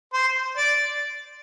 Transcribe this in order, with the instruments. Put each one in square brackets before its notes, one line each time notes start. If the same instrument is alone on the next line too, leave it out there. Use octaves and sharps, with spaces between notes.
[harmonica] C5
D5